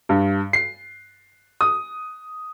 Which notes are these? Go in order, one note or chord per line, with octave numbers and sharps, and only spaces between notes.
G2
C7
D#6